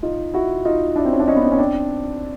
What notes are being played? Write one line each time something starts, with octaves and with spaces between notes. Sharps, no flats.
D#4 F4
E4 F#4
D#4 F4
D4 E4
C4
C#4
D4
C#4 D#4
B3
C4
C#4
C4 D4